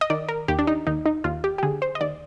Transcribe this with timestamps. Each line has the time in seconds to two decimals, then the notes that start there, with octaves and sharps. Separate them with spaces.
0.01 D#5
0.10 D#3 D5
0.28 A#4
0.48 D#2 G4
0.59 D4
0.67 D#4
0.87 D#2 D#4
1.06 D#4
1.24 D#2 F4
1.44 G4
1.58 G4
1.63 D3 G#4
1.82 C5
1.95 D#5
2.01 D#2 D5